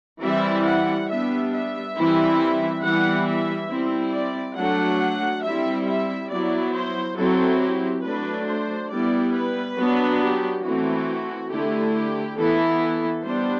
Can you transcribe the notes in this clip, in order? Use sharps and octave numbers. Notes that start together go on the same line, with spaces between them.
E3 G3 C4 E4 E5
F#5
G3 B3 D4 E5
E5
E3 G3 C4 E4
E3 G3 B3 E4 F#5
E5
G3 C4 E4
D5
F#3 A3 D4 F#5
G3 C4 E4 E5
E5
F#3 B3 E4 D5
C5
F#3 C4 E4 A4
G4
F#3 A3 D4 B4
C5
G3 B3 E4 D5
B4
F#3 B3 D4
G4
E3 A3 C4 E4 F#4
D3 A3 E4 G4
G4
E3 B3 E4 A4
A4
G3 B3 D4 C5